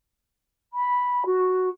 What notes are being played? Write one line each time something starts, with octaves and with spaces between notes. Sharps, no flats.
B5
F#4